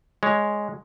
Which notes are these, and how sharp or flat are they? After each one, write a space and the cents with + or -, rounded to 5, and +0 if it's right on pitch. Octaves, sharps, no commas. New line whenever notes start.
G#3 +0 C#5 +0